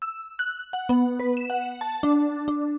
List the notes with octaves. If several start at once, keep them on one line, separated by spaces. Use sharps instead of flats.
E6
F#6
F#5
B3
B4
E7
F#5
A5
D4
D4